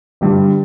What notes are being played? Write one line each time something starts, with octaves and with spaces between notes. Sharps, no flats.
G1 G2 D3 G3 G4